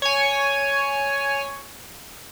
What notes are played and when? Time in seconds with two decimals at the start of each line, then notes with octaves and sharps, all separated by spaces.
0.02 C#5 G#5